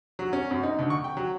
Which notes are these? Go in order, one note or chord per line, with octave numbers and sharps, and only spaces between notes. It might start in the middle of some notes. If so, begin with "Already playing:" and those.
F#3
C#4
F#2
D#4
D2
C#6
G5
F#3